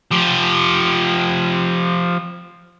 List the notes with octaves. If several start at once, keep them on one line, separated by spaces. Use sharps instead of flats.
F3 G4